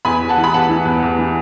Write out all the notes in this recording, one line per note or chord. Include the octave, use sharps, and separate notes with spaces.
E2 G#5 B5
E2
F#5 A5
E3
B5
E2 F#5 A5
E3
E2
E2
E3